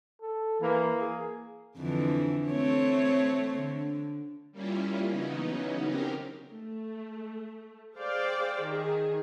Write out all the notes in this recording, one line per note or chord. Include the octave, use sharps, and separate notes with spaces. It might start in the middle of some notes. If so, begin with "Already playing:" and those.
A4
E3 A#3
G#4
F2 D3 E3
A3 C4 C#5
D3
G3 A#3 C#4 E4 F4
C#3 E3 F#3 B3 C#4 D#4
C4 C#4 D#4 G4 A#4
A3
G#4 C5 D5 F5 G5
D#3 G#4